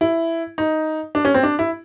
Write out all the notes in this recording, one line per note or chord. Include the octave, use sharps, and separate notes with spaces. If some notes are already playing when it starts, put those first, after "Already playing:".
E4
D#4
D4
C#4
C4
D4
E4